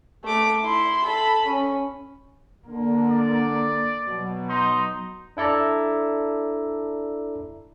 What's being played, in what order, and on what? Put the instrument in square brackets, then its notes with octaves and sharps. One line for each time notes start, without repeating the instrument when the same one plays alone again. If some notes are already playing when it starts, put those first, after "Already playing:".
[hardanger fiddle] A3 D6
E4 C6
A4 B5
C#4
[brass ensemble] D3 [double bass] A#3
[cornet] D5
[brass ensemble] B2 [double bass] F#3
[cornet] D#4 [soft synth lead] C6
[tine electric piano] D4 E4 A4 D5 A#5